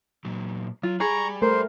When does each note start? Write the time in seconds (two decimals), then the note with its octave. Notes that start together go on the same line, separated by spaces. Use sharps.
0.25 A#2 F#3
0.83 F#3 F4
1.00 G3 G#4 A#5 B5 C#6
1.42 A3 A#4 C5